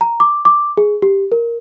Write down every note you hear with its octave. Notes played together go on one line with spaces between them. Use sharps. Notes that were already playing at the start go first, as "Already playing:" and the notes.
A#5
D6
D6
G#4
G4
A#4